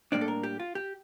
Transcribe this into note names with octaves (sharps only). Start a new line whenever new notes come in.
A2 G3 A#3 D4 D5
A4
A#4
G4
F4
G4